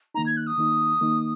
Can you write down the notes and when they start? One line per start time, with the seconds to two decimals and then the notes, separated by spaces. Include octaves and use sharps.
0.15 D#3 A#3 D#4 A#5
0.26 G#6
0.37 F#6
0.47 D#6
0.58 D#3 A#3 D#4
1.01 D#3 A#3 D#4